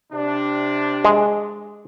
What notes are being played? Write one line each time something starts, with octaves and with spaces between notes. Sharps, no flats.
C3 D4
G#3